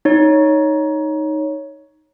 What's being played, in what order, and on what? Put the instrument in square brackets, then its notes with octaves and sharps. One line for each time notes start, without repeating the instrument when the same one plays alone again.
[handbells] D#4 C#5